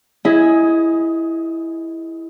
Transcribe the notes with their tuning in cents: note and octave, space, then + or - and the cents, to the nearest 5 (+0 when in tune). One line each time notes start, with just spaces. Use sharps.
E4 +0 G#4 +0 D#5 +20